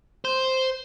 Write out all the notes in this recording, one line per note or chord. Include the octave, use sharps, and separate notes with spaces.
C5